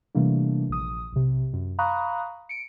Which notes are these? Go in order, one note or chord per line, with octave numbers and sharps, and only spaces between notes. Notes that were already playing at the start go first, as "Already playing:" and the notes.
C3 E3 G3 A3 A#3 D4
A#1 D#6
B1 C3
F#2
F5 A#5 B5 C#6 D#6 F#6
C#7 D7